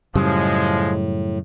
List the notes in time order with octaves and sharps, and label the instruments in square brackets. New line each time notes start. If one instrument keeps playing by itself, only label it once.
[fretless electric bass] F#2 C#3 G3 [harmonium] A2 [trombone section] F3 G#3